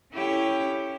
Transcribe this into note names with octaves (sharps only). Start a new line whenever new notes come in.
C#4 E4 G4 A4 C#5 G5